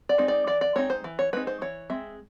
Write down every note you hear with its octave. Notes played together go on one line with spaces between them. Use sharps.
D5
G#3 C4 D#4
D5
E3 D5
D5
G#3 C4 D#4 C#5
C5
E3
C#5
G#3 C4 D#4 B4
C5
E3 C#5
G#3 C4 E5